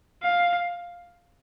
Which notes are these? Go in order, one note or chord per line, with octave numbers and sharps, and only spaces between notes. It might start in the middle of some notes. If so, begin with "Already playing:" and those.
F5